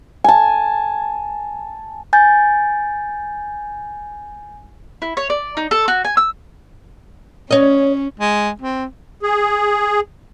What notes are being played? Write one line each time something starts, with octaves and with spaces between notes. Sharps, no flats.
G#5 A5
G#5 G6 A6
E4
C#5
D5
D#4
A4
F#4
G#5
E6
C#4 C#5 D#5
G#3
C4
G#4